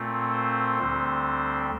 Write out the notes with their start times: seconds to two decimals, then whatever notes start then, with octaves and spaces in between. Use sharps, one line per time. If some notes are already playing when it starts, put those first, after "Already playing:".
Already playing: A#2 A3 C4
0.32 C5
0.78 D2 D3 G3 C4